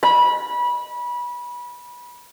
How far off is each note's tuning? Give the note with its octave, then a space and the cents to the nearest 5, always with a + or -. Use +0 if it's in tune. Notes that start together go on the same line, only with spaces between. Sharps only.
B5 -25